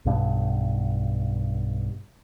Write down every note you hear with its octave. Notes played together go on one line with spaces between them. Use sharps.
B1 G2 B2